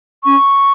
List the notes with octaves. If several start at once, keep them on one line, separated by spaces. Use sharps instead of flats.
C#4 C#6